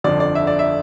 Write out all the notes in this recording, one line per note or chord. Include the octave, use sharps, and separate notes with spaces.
G1 F2 D3 F3 D5
D5
E5
D5
E5